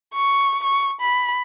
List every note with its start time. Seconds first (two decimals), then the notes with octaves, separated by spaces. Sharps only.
0.14 C#6
0.64 C#6
1.01 B5